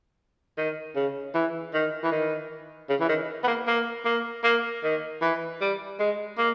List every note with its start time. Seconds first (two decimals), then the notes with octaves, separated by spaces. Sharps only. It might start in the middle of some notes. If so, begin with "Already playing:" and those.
0.57 D#3
0.95 C#3
1.34 E3
1.74 D#3
2.04 E3
2.12 D#3
2.89 C#3
3.00 E3
3.09 D#3
3.44 B3
3.47 A#3
3.67 A#3
4.05 A#3
4.43 A#3
4.83 D#3
5.21 E3
5.61 G3
5.99 G#3
6.38 A#3